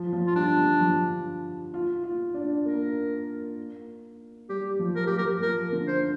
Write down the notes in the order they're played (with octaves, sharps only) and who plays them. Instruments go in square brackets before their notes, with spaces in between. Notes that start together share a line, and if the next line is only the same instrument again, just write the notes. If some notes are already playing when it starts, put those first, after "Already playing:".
Already playing: [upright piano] F3
F3
[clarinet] F4
[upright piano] G3 [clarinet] D4
[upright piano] D3
F3
F4
F4
D4
[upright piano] A#3 [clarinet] A#4
[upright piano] G3 [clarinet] G4
[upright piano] F3
[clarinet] A#4
[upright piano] F3 [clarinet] G4
[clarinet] A#4
[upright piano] F3 [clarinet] A#4
[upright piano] D3
[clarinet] C5